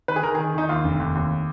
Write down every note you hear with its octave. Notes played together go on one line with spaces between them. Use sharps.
D#3 B4
G#4
D#3 A#4
G#4
D#3
D#3 D#4
D#2 F4
F1
D#2
D#2